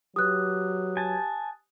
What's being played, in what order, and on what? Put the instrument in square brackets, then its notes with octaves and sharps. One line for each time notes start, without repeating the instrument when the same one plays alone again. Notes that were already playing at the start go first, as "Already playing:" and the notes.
[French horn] F#3 [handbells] G4 B4 [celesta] D#6 F#6
[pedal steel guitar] G#5 A5